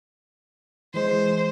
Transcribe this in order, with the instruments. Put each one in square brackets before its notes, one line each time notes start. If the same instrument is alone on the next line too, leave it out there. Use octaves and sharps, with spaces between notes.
[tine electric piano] E3 G#3 [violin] C5